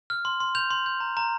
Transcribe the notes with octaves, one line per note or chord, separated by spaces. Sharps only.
F6
C6
C6
G6 F7
C6
G6
A#5
A#5